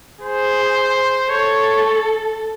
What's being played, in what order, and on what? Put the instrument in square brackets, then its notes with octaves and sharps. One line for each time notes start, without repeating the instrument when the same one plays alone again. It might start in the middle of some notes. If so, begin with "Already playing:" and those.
[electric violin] G#4 [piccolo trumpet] C5
[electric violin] A4 [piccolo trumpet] C#5